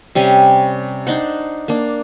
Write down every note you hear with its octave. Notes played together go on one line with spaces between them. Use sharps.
C3 G3 C#4 G#5
D4 D#4 C5 F#5
A#3 D4